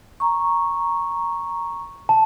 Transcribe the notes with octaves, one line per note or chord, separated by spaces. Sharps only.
A#5 C#6
A5